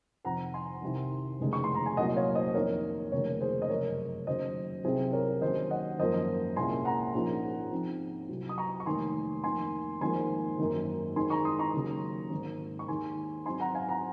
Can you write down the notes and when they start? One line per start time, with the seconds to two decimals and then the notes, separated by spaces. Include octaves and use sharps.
0.25 F2 C3 D#3 F#5 A#5
0.54 G#5 C6
0.82 C2 C3 D#3
1.40 F1 D#2 C#3 G#3 D#4
1.53 C#6
1.64 C6
1.74 A#5
1.86 G#5
1.97 C2 A#2 F#3 C#4 D#5 F#5
2.16 C#5 F5
2.35 C5 D#5
2.54 F2 D#3 A#3 A#4 C#5
3.12 F1 D#2 C#3 A#4 C#5
3.41 G#4 C5
3.62 D#5
3.69 F#1 F2 C3 A#4 C#5
4.27 D#2 C#3 F#3 C#4 C5 D#5
4.84 C2 C3 F#3 C4 D#4 G#4 C5
5.13 A#4 C#5
5.41 D#2 D#3 F#3 C#4 C5 D#5
5.71 D#5 F#5
5.99 G#1 F#2 F3 A#3 C#4 C5 D#5
6.56 C2 A#2 G#3 C#4 G#5 C6
6.85 F#5 A#5
7.14 A#1 G#2 F3 A#3 C#4
7.71 G#2 F3 C4
8.29 C2 C3 F#3
8.49 D#6
8.58 A#5 C#6
8.80 C#6
8.86 F1 D#2 D#3 G#5 C6
9.44 F2 D#3 A#3 G#5 C6
10.01 G#1 G#2 F3 A#3 G#5 C6
10.59 G#1 F#2 D#3 A#3 D#4
11.16 G#1 G#2 D#3 G#3 G#5 C6
11.30 A#5 C#6
11.45 C6 D#6
11.59 A#5 C#6
11.74 D#2 C#3 F#3
12.31 G#1 G#2 D#3 A#3
12.79 C#6
12.88 D#2 D#3 G#3 D#4 G#5 C6
13.46 G#2 F#3 C4 D#4 G#5 C6
13.60 F#5 A#5
13.75 F5 G#5
13.89 F#5 A#5